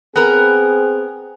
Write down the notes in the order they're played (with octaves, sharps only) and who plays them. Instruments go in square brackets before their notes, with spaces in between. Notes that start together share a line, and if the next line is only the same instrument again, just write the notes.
[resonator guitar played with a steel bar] B3 A#4 [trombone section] C4 G#4